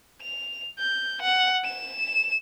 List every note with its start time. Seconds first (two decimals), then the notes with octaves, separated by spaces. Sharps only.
0.23 F7
0.79 G6
1.22 F#5
1.65 E7